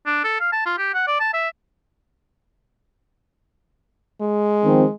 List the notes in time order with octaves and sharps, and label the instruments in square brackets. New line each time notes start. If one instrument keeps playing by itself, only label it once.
[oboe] D4
A4
F5
A5
F4
G4
F#5
D5
A5
E5
[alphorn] G#3
[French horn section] D#3 F3 C4